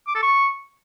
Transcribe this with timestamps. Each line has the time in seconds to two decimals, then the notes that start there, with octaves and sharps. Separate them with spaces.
0.07 D6
0.15 A4
0.23 C#6